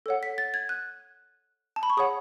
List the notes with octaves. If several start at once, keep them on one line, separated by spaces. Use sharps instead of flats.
A4 C#5 F#5
B6
A6
G#6
F#6
A5
B5
C#6
G#4 C#5 F#5 D#6